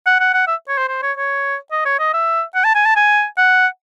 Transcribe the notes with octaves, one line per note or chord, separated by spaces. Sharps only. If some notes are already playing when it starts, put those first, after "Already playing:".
F#5
F#5
F#5
E5
C#5
C5
C5
C#5
C#5
D#5
C#5
D#5
E5
F#5
A5
G#5
A5
G#5
F#5